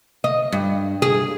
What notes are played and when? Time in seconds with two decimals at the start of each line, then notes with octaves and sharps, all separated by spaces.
0.24 D#5
0.52 G2
1.02 G#4